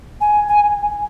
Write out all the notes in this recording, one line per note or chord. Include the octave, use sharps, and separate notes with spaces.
G#5
G#5